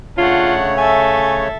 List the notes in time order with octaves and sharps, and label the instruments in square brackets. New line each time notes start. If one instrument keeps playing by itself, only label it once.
[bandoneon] C#3 A3 C#5 [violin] D4 F#5 [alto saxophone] F4
[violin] A4 E5 [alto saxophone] G#5